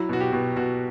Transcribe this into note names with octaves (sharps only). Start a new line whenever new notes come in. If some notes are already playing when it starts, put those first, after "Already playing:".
Already playing: F#3 E4
B2 F#4
G4
B2
B2 F#4